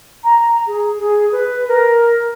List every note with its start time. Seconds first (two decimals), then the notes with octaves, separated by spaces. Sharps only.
0.24 A#5
0.67 G#4
0.99 G#4
1.32 B4
1.68 A#4